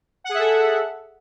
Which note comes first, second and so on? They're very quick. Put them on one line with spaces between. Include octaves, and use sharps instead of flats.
F#5 G#4 E5 A4